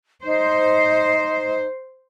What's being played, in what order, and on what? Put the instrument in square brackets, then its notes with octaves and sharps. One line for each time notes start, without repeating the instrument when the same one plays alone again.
[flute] D#4 [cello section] C5